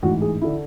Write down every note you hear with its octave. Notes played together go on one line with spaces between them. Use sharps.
A1 G#2 E3 F#4
G#4
D3 E4